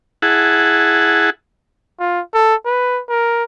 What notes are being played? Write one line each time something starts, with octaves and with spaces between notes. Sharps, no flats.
E4 G#4 F#5 A5
F4
A4
B4
A#4